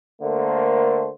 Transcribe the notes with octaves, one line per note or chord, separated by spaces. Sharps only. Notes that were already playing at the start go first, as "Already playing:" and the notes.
D3 A3 A#3 A#4 C5